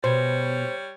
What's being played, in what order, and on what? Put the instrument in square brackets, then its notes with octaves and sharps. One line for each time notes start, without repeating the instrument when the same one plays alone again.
[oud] B2 [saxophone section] G3 C#5 [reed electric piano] C5